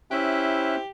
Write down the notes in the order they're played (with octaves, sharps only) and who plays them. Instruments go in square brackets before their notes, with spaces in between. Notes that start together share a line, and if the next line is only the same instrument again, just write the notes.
[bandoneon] C#4 E5 F#6 [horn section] E4 C5 [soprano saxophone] G4